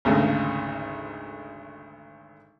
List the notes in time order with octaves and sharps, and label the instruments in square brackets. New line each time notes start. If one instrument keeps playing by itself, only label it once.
[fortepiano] G#1 D2 C#3 A3 D#4